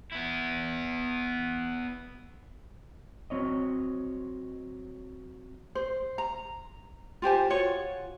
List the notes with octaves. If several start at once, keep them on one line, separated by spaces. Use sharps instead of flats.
B3 E4
F#3 C4 C#5 D#5
C5
A#5
F4 G4 C5 G#5
F4 F#4 C#5